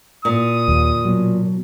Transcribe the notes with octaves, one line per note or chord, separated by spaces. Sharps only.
A#2 D#6
D#2
B2 F#3